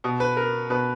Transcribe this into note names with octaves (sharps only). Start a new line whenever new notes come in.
B2
B4
A#4
B2 B4